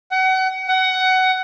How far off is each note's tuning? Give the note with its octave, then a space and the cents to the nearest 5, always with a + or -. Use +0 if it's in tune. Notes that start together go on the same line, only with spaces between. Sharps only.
F#5 +30
F#5 +20